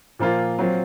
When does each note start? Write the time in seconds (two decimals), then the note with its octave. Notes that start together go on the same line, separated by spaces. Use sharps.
0.19 A#2 F3 A#3 F4
0.59 F#3 C4 F4